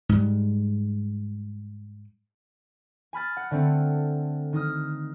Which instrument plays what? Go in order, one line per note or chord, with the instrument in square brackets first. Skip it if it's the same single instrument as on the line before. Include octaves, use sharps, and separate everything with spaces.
[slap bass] G#2 G3
[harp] G#5 B5 F6 A6
F#5
D3 A3 C4
D#3 D#4 D#6 F6